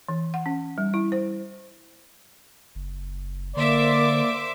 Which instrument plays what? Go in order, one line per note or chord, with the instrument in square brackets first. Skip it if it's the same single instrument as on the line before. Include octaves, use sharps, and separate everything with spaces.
[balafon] E3
F#5
C#4
G3
E4
C5
[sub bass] F#1
[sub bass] D3 [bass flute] A#3 [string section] C5 E5 D6 [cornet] D5